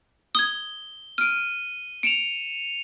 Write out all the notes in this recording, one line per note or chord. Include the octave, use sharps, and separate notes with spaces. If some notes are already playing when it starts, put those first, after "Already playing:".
D#6 G#6 G7
F6 D7 D#7
C#7 D7 E7 F7